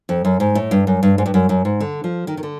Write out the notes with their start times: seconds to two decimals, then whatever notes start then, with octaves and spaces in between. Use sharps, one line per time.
0.09 F2
0.25 F#2
0.40 G#2
0.55 A2
0.71 G2
0.87 F#2
1.03 G2
1.18 G#2
1.26 G2
1.34 F#2
1.49 F#2
1.65 G#2
1.80 D3
2.04 F3
2.27 D#3
2.37 D#3
2.43 D3